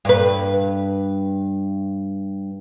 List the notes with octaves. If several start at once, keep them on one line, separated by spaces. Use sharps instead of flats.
G2 B4